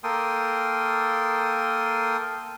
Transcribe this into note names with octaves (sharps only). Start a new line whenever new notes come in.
A#3 A4 A#4 G5 C6 D#6